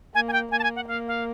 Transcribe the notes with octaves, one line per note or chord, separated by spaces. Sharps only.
A#3 G#5
G#5
G5
A#3 G#5
A5
G#5
F#5
A#3 F5
F5